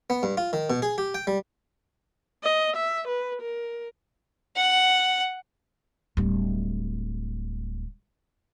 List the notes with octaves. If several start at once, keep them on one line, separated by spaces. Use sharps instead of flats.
B3
G2
F4
D#3
B2
G#4
G4
G5
G3
D#5
E5
B4
A#4
F#5
D1 G3